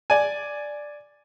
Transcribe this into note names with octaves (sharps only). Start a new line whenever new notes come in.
D5 G#5